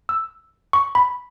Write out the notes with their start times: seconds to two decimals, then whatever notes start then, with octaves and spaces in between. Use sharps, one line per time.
0.09 E6
0.73 C#6
0.95 B5